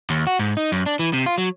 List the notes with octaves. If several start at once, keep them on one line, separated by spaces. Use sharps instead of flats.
D#2
F#4
G#2
D#4
F#2
D4
E3
C3
F4
F#3